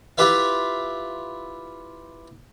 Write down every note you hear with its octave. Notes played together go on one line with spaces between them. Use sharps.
E4 F4 G4 B4 E5 F5